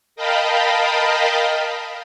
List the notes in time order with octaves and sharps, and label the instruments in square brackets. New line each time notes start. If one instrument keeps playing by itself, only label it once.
[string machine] A#4 D#5 F5 G5 A5 B5